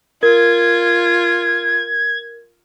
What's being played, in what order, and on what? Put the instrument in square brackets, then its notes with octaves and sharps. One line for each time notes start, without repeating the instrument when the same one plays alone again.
[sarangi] F4 [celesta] A#4 [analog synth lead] G#6